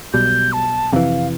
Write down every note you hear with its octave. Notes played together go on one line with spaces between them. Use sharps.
B1 B2 G3 G6
A5
F2 C3 E3 F5